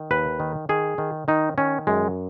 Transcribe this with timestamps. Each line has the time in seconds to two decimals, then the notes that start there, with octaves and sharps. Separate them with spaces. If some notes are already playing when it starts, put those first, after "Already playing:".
Already playing: D#3
0.11 D#2 B4
0.40 D#3
0.69 D#3 G#4
0.98 D#3
1.28 D#3 D#4
1.58 D#3 C#4
1.87 F#2 G#3